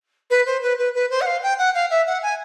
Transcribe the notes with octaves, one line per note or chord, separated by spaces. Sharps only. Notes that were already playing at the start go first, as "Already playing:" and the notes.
B4
C5
B4
B4
B4
C5
F#5
F5
G5
F#5
F5
E5
F#5
G#5